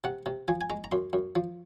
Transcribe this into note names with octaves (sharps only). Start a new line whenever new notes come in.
C3 F#5
C3
F3 G#5
G#5
G#3 A#5
A#5
F#2 C6
F#2
F3